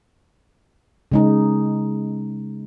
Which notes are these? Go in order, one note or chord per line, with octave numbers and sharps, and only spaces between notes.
C#3 G#3 D#4